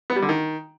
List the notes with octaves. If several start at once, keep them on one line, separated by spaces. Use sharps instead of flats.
B3
G3
D3
D#3